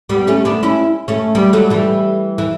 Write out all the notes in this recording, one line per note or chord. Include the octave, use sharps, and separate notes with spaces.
G3 B3
A3 C#4
B3 D4
C#4 E4
A3 C#4
G3 B3
F#3 A3
E3 G3
E3